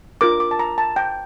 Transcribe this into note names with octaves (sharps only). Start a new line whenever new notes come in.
D4 F4 A#4 D6
D6
A5
A#5
A5
G5